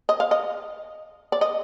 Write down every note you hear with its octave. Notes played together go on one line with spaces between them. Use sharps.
D#5
F5
D#5
D5
D#5